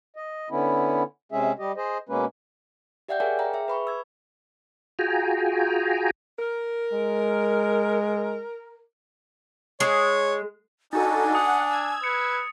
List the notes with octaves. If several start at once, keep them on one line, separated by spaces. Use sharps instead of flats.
D#5
D3 B3 C#4 E4
C3 G#3 C#4 G#4 E5
G3 G4 D#5
G#4 C5 D#5
B2 G#3 A#3 C#4 B4
G4 D5 E5 F#5 G5 G6
G#4 A#4 C#5 F5 G5 G#5
F5 G5 A#5
G#4 E5
B4 B5 C#6
E6 G#6
F4 F#4 G#4 G5 G#5 A#5
A#4
G#3
G#3 C#5
D4 D#4 F#4 A4 G#5 A6
F#5 D#6
E6 G#6
B4 C#7